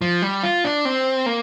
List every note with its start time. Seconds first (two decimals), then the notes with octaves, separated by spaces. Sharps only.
0.02 F3
0.22 G3
0.43 F4
0.64 D4
0.85 C4
1.26 A#3